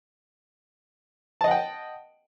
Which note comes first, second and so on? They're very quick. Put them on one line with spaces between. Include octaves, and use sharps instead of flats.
A5 D#5 F#5 G5